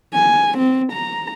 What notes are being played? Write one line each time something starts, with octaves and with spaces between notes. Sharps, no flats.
G#5
C4
A#5